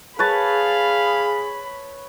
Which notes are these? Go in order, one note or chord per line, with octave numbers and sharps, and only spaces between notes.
G#4 B4 C#5 F5 A5 B5